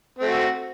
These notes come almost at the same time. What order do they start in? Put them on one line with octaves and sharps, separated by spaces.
C4 A3 F#4